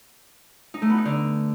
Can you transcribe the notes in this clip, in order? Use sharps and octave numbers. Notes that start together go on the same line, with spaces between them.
D#4
A3
B3
D#4
D3